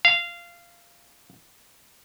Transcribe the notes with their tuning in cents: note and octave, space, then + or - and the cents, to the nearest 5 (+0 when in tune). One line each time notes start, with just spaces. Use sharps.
F5 -15